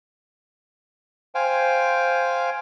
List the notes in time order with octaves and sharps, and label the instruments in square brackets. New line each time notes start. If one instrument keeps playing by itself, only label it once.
[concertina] C5 F5 G5 G#5